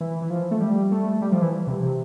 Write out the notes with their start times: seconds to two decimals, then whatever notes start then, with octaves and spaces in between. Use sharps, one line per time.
0.01 E3
0.22 E3
0.30 F3
0.51 A3
0.61 G3
0.92 A3
1.22 G3
1.32 F3
1.42 E3
1.67 C3
1.83 C3